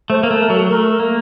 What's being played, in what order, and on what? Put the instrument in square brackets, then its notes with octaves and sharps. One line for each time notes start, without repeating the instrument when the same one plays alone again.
[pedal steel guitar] A3 [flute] C5
[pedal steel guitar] A#3 [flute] A#4
[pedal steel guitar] A3
[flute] A#4
[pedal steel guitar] F#3
[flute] A4
[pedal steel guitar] A3 [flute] A#4
[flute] A#4
[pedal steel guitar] A#3